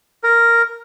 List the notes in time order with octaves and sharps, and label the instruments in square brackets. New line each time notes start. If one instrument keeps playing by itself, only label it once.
[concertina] A#4